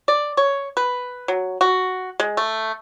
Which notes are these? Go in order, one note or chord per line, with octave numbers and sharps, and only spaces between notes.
D5
C#5
B4
F#3
F#4
G#3
A3